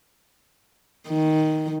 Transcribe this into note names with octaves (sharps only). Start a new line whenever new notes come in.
D#3